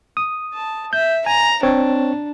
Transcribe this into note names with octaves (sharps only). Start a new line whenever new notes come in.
D#6
A5
E5 G6
G#5 A#5
C4 D4 C#5